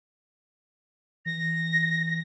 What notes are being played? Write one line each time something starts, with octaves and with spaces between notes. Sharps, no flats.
E3 A#6